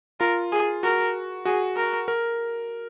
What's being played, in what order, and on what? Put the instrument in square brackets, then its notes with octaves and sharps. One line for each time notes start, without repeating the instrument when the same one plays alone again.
[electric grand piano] F4 [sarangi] A#4
[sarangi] G#4
[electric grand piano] F#4 [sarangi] A#4
[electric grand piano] F#4 [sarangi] G#4
[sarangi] A#4
[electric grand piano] A#4